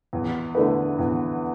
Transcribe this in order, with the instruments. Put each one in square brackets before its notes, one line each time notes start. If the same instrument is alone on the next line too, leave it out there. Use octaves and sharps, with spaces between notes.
[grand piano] E2
D3 A3 E4 B4
E2